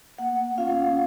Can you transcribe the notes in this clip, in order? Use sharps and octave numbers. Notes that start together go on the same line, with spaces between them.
A#3 F#5
C#4 F4 F5